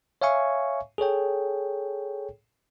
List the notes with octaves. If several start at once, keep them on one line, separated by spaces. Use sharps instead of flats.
C#5 E5 F5 G#5 C#6
G#4 A4 C#5 G5